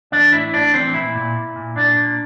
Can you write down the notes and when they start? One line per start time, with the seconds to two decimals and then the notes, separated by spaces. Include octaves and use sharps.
0.12 E3 D4 D5
0.32 A2 E4 E5
0.54 A2 D4 D5
0.74 E3 C4 C5
0.94 A#2 E4 E5
1.15 A#2
1.36 A#2
1.56 A#2
1.76 A#2 D4 D5
1.96 A#2